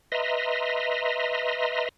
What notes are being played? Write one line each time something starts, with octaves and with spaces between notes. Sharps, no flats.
B4 D#5 E5 A#5 C6